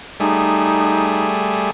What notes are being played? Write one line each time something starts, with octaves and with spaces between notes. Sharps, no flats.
G3 A3 D#4 G#4